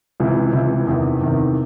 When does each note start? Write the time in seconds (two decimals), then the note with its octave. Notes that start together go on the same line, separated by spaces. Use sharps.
0.20 C#2 C3 E3
0.53 C#2 C3 E3
0.87 E2 C3 D#3
1.21 E2 C3 D#3